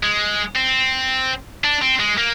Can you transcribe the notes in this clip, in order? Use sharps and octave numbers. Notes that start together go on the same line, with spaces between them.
G#3
C4
D4
C4
G#3
A#3